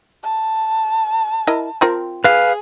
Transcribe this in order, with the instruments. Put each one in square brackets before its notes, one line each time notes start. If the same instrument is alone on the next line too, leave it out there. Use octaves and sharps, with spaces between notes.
[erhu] A5
[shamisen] E4 A#4 D#5
C4 F4 A#4
[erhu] G#4 [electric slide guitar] B4 F5